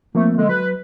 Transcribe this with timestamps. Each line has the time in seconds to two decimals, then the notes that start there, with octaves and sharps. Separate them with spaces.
0.15 F3 A3 A#3 C4
0.37 D3 G#3
0.49 F#3 B4